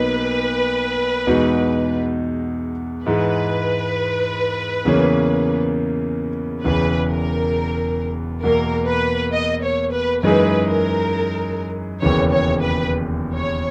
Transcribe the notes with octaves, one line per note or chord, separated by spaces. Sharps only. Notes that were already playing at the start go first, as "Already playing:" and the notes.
Already playing: B1 B2 A#3 D#4 B4
E2 B2 G#3 D#4 F#4
G#2 E3 G#3 B4
E2 C#3 E3 A#3 C#4
E1 E2 C#3 E3 B4
A#4
E2 B2 A#3 A#4
B4
D#5
C#5
B4
F#2 E3 G#3 D#4 G#4 B4
A#4
E1 D#2 C#3 E3 C#5
C#5
B4
C#5